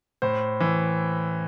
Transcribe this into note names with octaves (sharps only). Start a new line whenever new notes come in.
A2 C5
E3